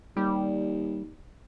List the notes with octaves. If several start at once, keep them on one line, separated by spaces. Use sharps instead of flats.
D#2 G3